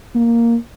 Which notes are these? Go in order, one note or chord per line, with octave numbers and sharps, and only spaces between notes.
A#3